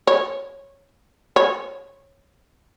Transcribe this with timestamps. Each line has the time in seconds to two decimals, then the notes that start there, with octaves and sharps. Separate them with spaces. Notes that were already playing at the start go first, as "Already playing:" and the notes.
0.07 C#5
1.36 C#5